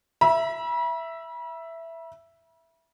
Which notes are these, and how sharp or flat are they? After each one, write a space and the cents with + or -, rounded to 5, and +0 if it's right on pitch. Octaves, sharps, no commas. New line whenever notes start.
E5 +5 B5 -40